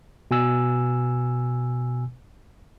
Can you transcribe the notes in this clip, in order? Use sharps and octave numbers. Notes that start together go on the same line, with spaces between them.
B2 G#5 E6